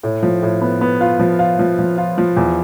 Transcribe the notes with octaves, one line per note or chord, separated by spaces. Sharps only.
A2
F3
A2
B3
B3
F4
F3
F4
F3
F3
F4
F3
E2